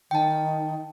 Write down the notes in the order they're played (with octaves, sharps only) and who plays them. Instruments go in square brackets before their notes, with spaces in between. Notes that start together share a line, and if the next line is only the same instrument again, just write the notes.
[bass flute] D#3 [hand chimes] G5 A5